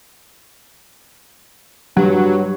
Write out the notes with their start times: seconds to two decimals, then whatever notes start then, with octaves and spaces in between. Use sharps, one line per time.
1.97 G2 F#3